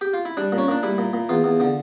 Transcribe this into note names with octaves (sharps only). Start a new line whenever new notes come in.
G4
F4
E4
G3 D4
A#2
C#4
A#2 D4
G3 E4
A#2
A#2
E2 F4
E2
D3